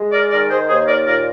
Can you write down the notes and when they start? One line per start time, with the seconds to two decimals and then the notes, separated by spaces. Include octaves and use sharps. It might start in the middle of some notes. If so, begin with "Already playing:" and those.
Already playing: G#3
0.12 A#4 D5
0.31 D#3 A#4 D5
0.50 G#4 C5
0.68 D#2 G#4 C5
0.87 A#4 D5
1.06 A#2 A#4 D5